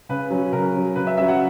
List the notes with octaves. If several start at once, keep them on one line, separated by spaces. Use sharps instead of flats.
C#3 B4
F#3 C#4
C#3 A#4
F#3 C#4
C#3 B4
E5
F#3 C#4 E5
F#5